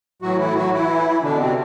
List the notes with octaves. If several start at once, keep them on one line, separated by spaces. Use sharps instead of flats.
A2 E3 F#3 F#4
E3 E4
F#3 F#4
E3 E4
B2 D3 D4
C3 C4